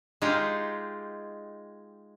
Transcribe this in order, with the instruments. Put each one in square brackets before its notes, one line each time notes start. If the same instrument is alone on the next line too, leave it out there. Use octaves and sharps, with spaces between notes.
[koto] G#3 D#4 F4 G4